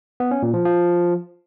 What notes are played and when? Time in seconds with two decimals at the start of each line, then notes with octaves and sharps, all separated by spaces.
0.20 B3
0.31 C#4
0.42 A#2
0.54 F3
0.65 F3